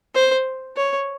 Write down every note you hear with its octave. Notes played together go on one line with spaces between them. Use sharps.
C5
C#5